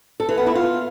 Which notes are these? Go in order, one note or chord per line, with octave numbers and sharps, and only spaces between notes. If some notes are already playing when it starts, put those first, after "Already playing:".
A4
E3
B3
E4
F4